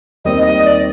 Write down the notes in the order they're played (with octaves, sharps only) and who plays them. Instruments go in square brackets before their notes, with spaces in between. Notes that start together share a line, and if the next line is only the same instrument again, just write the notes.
[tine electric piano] D#2 D#3 G3 C4 [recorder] D#5
[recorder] D#5
D5